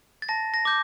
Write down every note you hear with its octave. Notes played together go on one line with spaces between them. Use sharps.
A6
A5 A#6
A#6
D6 G6